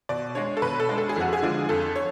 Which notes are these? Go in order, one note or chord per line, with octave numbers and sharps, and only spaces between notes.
B2 D5
G#3 D4 C#5
A4
B2 B4
A4
G#3 D4
A4
G#4
F2 F#4
G#4
D3 F3 G#3 D4
F2 A4
C#5